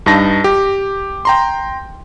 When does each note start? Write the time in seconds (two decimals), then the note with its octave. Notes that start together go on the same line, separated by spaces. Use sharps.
0.06 G2 D#4 A5 A#6
0.44 G4
1.25 G5 A#5 C6